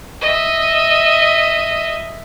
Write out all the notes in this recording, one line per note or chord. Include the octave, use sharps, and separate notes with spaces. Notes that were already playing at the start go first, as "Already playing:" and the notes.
D#5 E5